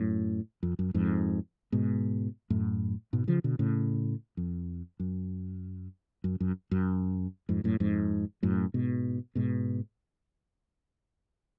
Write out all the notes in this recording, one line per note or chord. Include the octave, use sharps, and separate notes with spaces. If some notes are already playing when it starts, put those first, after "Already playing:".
Already playing: F#2 A2
F2
F#2
F2 G#2
G#2 B2
F#2 A2
G#2 B2
C#3 F3
B2 D3
A2 C#3
F2
F#2
F#2
F#2
F#2
F2 G#2
F#2 A2
F2 G#2
F#2 A2
G#2 B2
G#2 B2